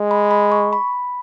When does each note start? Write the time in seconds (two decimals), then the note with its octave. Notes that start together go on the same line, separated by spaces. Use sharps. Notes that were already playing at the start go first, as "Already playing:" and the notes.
Already playing: G#3
0.11 B5
0.31 B5
0.52 C#6
0.73 B5